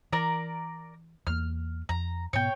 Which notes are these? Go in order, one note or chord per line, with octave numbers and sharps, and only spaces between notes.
E3 A#4 D5 A#5
E2 A#3 F6
F2 A#5
G#2 B2 B3 C#5 G5